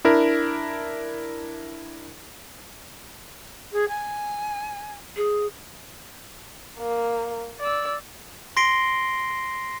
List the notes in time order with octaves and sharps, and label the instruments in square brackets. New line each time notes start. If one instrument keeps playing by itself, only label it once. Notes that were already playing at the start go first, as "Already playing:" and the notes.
[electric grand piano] D4 E4 A#4
[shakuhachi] G#4
G#5
[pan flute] G#4
[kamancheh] A#3
D5 E6
[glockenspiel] C6 A#6 C7 D7 G7